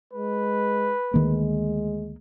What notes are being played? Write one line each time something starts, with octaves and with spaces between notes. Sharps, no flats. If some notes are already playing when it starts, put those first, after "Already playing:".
G#3 B4
D2 D#3 G#3 A#3